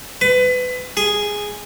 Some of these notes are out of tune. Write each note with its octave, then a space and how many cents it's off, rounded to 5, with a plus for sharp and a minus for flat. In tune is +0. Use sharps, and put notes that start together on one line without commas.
B4 +25
G#4 -5